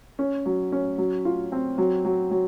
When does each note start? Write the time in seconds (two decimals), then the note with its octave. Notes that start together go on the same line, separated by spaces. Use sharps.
0.19 C#4
0.46 F#3
0.72 C#4
0.98 F#3
1.25 F4
1.52 C4
1.78 F#3
2.05 F#3
2.31 F#3